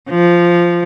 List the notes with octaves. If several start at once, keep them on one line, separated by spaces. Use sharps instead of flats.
F3